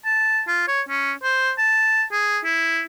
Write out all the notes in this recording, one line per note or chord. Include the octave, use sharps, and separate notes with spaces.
A5
F4
C#5
C#4
C5
A5
G#4
E4